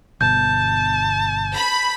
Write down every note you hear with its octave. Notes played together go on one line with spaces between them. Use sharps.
G1 B2 B3 A5 G6
B5